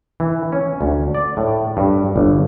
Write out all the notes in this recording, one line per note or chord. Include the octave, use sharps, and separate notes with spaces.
E3
C#4
D2
D5
A2
G2
G1